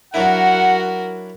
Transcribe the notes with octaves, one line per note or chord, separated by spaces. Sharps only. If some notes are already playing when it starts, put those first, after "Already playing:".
F#3 D4 E4 F#4 A#4 F#5